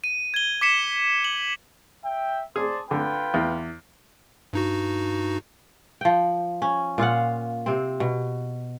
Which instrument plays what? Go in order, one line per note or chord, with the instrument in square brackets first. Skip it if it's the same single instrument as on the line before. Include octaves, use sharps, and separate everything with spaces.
[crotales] D#7
G#6 G7
D6 B6 C#7 E7
F#7
[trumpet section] E5 G5
[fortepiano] G#4 [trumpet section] C5 D5 A5
[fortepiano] D3 [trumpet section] F4 B4 G5
[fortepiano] E2
[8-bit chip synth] G2 D#4 F#4
[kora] F3 G5
C#4
A#2 F4 F5 F#5
C3 C4
B2